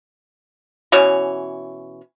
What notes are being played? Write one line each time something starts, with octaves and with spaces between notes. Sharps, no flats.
B2 E3 C#4 C#5